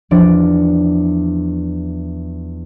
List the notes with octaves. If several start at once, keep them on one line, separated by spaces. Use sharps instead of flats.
E2 F3 D4 D5